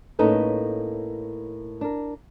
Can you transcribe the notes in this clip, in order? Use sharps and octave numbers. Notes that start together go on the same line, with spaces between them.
A2 A#3 C#4 D#4 A4 B4
D4 A#4